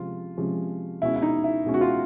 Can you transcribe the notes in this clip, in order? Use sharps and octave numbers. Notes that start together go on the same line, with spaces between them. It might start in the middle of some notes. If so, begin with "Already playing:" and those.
Already playing: C3 F3 G#3 C#4 F4
C3 F3 G#3 C#4
B2 G#3 C#4 E4
E4
D#4
E4
B2 G#3 C#4
F#4
F4